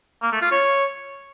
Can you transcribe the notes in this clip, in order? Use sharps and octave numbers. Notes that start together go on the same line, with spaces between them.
A#3
A3
F4
C#5